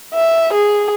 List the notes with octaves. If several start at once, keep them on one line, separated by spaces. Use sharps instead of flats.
E5
G#4